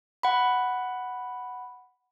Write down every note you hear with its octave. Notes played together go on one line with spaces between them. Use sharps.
F#5 B5